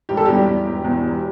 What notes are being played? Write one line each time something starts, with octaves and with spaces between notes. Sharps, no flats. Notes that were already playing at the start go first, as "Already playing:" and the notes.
E1 G4
A4
E2 G3 G4
E2
E1
E2
E1